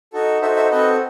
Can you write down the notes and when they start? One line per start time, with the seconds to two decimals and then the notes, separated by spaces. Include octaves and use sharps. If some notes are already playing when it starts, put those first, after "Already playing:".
0.13 D#4 F#4 A4
0.42 D#4 F#4 A4 C5 E5
0.56 C5 E5
0.71 C4 F#4 A4 B4 D#5